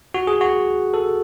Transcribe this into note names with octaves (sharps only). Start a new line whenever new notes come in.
F#4
G#4
F#4
A4